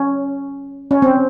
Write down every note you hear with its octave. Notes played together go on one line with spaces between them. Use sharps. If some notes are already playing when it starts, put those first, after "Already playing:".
Already playing: C#4
C#4
C4